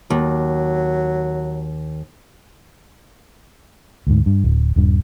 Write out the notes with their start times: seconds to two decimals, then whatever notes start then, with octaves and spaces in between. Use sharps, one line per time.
0.10 D#2 F#3
4.07 D2 G#2
4.26 G2
4.44 D1
4.76 D#1 G2